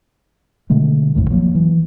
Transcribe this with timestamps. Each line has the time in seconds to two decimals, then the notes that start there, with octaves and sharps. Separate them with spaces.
0.70 B2 D3 G#3 A3
1.15 A#1 F2 A2 D#3
1.30 F3 F#3 A#3
1.55 E3